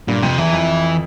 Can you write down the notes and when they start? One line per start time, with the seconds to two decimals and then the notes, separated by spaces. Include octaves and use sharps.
0.08 G2 A#2
0.23 F2 C3
0.38 E2 E3
0.52 F2